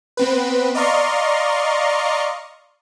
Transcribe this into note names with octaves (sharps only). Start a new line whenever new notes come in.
B3 C4 B4
D5 D#5 F5 A#5 C6 C#6